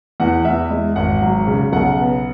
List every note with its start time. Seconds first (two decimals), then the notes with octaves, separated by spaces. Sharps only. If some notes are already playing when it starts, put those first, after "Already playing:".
0.20 E2 F#5
0.45 E2 E5
0.70 G#3
0.96 G#1 F#5
1.22 F#3
1.47 C#3
1.72 B1 F#5
1.99 B3